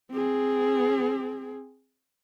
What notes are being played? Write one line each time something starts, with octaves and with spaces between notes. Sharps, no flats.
C4 G#4